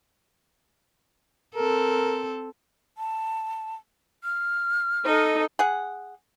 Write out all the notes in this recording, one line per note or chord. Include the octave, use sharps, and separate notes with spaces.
C4 A4 A#4
A5
F6
D#4 A4 D#5
G#4 F#5